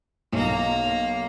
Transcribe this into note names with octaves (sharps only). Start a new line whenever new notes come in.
B1 A#3 A#5